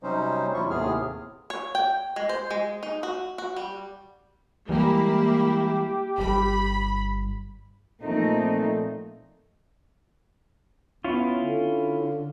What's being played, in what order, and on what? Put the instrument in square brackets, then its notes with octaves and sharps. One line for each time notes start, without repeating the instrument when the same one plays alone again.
[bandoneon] C3 F#3 G3 C#4 D#4 C5
E2 C3 F#3 E4 F4 C#6
D#2 A2 C3 B3 G#4 F6
[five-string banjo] C#5
G5
G#3
C5
G#3
D#4
F#4
F#4
G3
[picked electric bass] E3 G3 G#3 [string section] A#3 E4 [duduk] G4
[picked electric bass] G1 G3 [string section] B5
[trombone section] A#2 A3 [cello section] F3 C4 D#4
[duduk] B3 [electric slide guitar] C#4 E4 F4
[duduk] D3